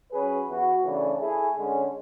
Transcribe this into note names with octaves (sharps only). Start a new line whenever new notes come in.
F#3 C#4 G#4 B4
E3 B3 F#4
C#3 E3 A3 D4
A3 E4 G#4
D3 G#3 C#4